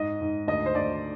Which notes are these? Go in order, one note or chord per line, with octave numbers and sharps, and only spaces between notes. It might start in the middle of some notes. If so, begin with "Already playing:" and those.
Already playing: G#2 D#5
G#2
D2 D#5
C5
D2 D5